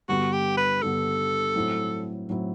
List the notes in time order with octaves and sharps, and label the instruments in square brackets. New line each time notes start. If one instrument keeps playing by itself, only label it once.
[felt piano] G2 D3 G3 B3 [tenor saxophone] F#4
[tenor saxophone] G4
B4
[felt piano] G2 D3 G3 B3 [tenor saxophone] A4
[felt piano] A2 F#3 C4 E4
A2 F#3 C4 E4